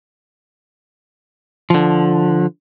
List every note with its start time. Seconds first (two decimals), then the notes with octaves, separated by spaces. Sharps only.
1.70 D3 F3